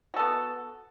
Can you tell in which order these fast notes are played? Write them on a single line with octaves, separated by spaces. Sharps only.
F#4 A4 B3